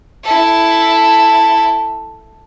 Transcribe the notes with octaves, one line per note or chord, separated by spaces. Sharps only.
E4 A4